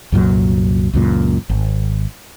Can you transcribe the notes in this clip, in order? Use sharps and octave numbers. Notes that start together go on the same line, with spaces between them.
C2 F#2 A#2 F#3
C#2 F#2 A#2
G#1